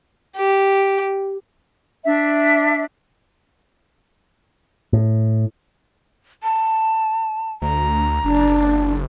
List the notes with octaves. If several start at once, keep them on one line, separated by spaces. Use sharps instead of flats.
G4
D4 E5
A2
A5
D2 A#5
F#1 D4